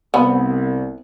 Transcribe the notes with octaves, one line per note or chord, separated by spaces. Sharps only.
C2 B3